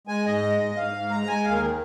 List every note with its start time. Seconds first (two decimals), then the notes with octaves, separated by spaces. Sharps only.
0.07 G#3 G#5
0.26 G#2 D#5
0.43 G#3
0.60 G#2
0.76 G#2 F5
0.94 G#2
1.10 G#3 A#5
1.27 G#3 G#5
1.45 D#2 F5
1.52 A#4
1.61 D#3 G#4